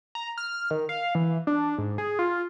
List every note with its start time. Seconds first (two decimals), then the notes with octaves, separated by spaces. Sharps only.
0.15 A#5
0.38 F6
0.71 D#3
0.89 F5
1.15 E3
1.47 D4
1.78 G#2
1.98 G#4
2.19 F4